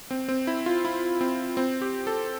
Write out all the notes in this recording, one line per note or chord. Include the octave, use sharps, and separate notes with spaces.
C4
C4
E4
F4
E4
C4
C4
G4
A4